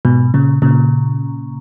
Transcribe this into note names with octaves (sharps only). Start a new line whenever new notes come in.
G#2 B2
A#2 C#3
A#2 C#3